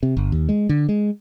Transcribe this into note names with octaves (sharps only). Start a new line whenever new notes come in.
C3
G1
D#2
G#3
D3
G#3